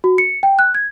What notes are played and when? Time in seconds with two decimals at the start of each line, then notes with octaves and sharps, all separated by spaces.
0.04 F#4
0.18 C#7
0.43 G5
0.59 F#6
0.74 G#6